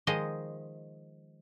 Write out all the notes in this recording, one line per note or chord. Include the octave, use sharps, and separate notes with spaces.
D#3 F3 G#3 G#4 C5 D#5